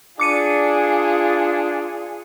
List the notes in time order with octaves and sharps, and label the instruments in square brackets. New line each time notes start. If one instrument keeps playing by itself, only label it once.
[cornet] D4 [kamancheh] F4 G#4 [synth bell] D6 C#7 D#7